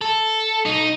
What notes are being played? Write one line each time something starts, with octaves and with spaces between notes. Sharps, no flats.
A4
B1 D#4